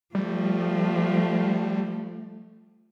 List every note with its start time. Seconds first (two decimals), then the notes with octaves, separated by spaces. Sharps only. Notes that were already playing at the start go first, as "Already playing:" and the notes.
0.15 F3 G3 A3